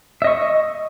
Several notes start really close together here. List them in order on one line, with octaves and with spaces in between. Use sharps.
E5 D#5 C#6